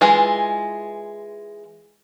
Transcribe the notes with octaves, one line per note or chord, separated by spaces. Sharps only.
E3 G#3 F4